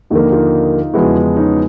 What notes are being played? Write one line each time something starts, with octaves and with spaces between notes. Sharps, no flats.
D#2 D3 F3 A#3 D#4 F4
D#4 F4
E2 C#3 F3 G#3 B3 E4 F#4
C#4 D#4